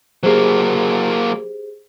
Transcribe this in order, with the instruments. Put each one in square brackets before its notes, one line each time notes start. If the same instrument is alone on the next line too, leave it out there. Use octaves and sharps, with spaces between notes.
[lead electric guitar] F#3 A#3 [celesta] G4 G#4 C5